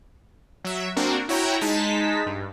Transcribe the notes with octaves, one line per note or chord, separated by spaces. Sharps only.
F#3 E5
A#3 C4 D4 F#4 A#4
E4 F#4 C#5 G5 A#5
G#3 D#4 A5 B6
G2